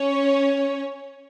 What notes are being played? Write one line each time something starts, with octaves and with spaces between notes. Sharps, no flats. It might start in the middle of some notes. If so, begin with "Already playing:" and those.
Already playing: C#4 C#5